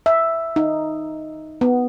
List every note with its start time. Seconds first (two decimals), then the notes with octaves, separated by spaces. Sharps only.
0.06 E5
0.56 D#4
1.61 B3